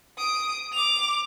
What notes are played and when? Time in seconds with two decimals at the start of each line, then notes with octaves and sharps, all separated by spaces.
0.18 D#6 D7
0.72 D6 F7